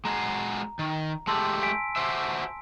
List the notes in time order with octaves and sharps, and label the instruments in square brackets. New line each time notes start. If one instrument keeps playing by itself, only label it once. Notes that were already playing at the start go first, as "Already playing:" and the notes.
[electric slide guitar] G#3 F#4 G#4 [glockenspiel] A#5
[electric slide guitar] D#3
[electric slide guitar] G#3 A3 G4 [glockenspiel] A5 C6 E6
[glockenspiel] G#5 B6 D7
[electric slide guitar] F#4 C5 E5